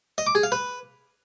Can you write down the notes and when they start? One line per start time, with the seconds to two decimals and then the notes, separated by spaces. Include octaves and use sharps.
0.18 D#5
0.27 D6
0.35 G#4
0.43 F5
0.52 B4